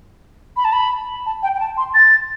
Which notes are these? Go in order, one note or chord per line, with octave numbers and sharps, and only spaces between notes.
B5
A5
B5
A5
G5
G5
A5
C6
A6